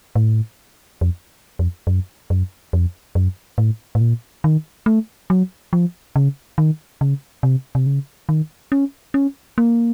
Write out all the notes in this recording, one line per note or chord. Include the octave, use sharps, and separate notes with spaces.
A2
F2
F2
F#2
F#2
F2
F#2
A2
A2
A#2
D#3
A3
F#3
F3
C#3
D#3
C#3
C3
C3
C#3
D#3
C#4
C#4
A#3